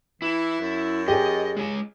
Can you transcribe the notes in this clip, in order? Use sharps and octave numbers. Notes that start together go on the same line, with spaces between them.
E3 E4
F#2
G4 G#4 D#5
G#3 C#5 G#5